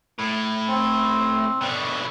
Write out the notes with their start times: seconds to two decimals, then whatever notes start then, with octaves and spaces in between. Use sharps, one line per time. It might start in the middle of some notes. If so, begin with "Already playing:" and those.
0.19 A2
0.68 C4
1.61 B2 D3